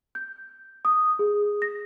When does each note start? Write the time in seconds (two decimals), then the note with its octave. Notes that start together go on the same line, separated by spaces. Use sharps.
0.15 G6
0.85 D#6
1.19 G#4
1.62 A#6